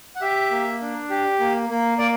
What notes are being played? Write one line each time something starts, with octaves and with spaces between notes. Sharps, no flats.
F#5
G4 E5
A#3
D4
G4
A#3
A#3
A#3 D5